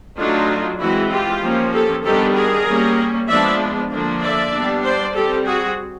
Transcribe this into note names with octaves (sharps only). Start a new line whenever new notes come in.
F#3 A3 D4 D#4 F4
E3 G#3 C4 E4 F#4
F4 G4
F3 A#3 C#4
G4 A4
D#3 G3 B3 D4 G4 A4
G#4 A#4
G3 A#3 C#4
F3 G#3 B3 D4 D5 E5
D3 F3 A#3 D4
D5 E5
G3 B3 D4
C5 D5
G3 C4 G4 A4
F#4 G#4